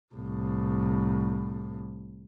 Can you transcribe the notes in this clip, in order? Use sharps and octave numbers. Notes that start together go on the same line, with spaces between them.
C2 A2